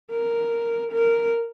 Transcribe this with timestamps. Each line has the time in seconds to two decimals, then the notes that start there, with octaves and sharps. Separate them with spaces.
0.12 A#4
0.92 A#4